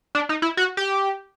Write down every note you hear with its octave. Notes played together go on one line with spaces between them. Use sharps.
D4
D#4
E4
F#4
G4